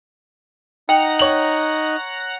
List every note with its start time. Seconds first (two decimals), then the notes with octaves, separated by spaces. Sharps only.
0.89 D#4 F#5 G5 A#5
1.19 C#5 F#7